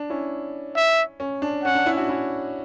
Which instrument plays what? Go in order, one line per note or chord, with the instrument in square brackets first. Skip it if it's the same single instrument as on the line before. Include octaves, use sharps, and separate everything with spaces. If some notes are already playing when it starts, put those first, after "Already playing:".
Already playing: [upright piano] D4
C#4 E4
[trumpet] E5
[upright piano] C#4
D4
[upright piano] C#4 [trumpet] F#5
[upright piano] D4
C#4 E4
D4 F#4
C#4 E4